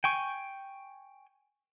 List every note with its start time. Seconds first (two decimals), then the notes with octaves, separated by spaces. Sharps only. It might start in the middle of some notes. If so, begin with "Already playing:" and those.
0.04 G5 G#5 C#6